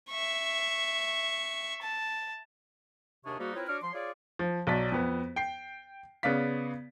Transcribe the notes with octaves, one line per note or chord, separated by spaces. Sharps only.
E5 C#6
A5
D#2 C3 D4 G#4 C#5 C#6
G#2 G3 A#3 D#4 F#4
C4 E4 F4 A#4 B4 C#5
D4 F#4 C#5 D6 F6
F3 C6
F4 G#4 C#5 D5
F3
B1 F#3 D5 B6
F2 B3
G5 C7
C#3 B3 D5 F5 B6